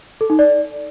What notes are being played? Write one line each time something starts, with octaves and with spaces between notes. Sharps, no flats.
A4
D#4
D5